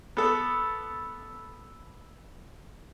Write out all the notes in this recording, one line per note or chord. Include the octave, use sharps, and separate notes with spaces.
B3 A4